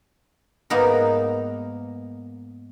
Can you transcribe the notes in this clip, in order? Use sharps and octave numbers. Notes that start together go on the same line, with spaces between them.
G#2 A#3 B3 D#4 A#4